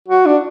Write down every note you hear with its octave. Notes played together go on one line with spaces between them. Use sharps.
F#4
D4